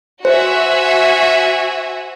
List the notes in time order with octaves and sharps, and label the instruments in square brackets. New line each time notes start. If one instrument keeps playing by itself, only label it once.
[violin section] F#4 E5 G#5 [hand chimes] C5